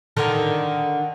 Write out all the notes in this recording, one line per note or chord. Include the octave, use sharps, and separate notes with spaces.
D3 D#3 A4